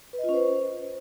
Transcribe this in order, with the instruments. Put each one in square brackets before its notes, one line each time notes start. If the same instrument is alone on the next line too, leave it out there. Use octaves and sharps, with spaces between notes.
[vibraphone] B4
D#5
F4
C#4
C5